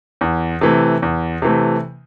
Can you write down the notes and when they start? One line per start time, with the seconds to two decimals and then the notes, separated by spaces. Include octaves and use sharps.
0.21 E2
0.61 C3 E3 A3
1.02 E2
1.42 C3 E3 A3